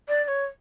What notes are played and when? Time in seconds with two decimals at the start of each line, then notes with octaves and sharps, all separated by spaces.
0.08 D5
0.24 D5
0.28 C#5